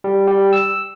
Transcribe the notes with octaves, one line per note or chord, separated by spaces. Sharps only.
G3
G3
E6